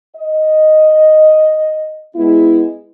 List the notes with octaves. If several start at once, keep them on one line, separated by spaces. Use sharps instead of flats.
D#5
G#3 B3 E4